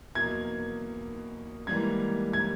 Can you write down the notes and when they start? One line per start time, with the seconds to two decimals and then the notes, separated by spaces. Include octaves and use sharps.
0.15 E2 B2 F#3 A#3 G#6
1.67 G#2 E3 G3 A#3 G#6
2.33 G#6